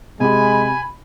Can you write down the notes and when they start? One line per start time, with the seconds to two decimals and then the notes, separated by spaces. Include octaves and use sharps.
0.20 C3 G#3 G4 G#5 B5